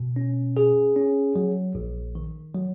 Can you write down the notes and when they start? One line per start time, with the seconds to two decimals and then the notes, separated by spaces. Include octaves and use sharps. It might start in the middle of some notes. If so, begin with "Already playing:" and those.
Already playing: B2
0.16 C#4
0.57 G#4
0.96 C#4
1.36 F#3
1.75 A#1
2.15 D#3
2.55 F#3